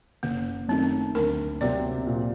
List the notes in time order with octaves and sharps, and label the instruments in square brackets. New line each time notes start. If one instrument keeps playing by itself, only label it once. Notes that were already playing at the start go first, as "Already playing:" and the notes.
[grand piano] F#1 [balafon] A#3
[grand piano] F#2 D#3 A3 [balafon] C4
[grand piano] D2 [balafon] A#4
[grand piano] C3 F#3 C4 [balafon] D5
[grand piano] A#2